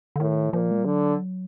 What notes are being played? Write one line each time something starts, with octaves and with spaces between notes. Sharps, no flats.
D3
A2 D#3
A#2 F3
G#3
G3
D3 F#3